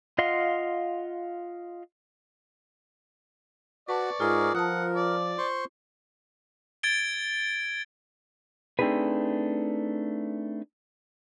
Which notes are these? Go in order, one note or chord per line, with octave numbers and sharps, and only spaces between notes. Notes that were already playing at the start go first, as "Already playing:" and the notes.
F4 D#5 F5 F#5 C6
F#4 B4 D5 A5 C#6
G#2 F4 G#4 A#4
F3 A#4 F#5 A5 D#6
D5
C5 C6 C#6
G#6 A6 D7 G7
A3 C4 D4 D#4 G#4 B4